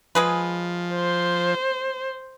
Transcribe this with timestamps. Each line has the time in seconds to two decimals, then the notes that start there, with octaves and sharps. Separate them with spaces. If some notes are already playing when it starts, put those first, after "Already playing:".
0.15 F3 G#3 G#4 B4
0.95 C5